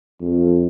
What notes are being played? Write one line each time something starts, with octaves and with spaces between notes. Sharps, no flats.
F2